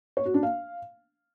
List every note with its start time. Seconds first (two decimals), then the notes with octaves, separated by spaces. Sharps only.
0.17 C#5
0.26 F#4
0.34 D4
0.43 F5